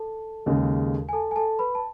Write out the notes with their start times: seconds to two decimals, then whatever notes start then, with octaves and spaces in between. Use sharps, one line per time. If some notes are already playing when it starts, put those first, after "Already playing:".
Already playing: A4 A5
0.46 D#2 C#3 G#3
1.09 G#5
1.13 A4 A5
1.31 G#5
1.36 A4 A5
1.59 B4 B5
1.75 A5